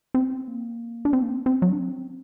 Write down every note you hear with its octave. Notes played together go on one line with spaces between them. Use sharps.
C4
A#3
D4
C4
A#3
C4
C4
F#3
D4
C4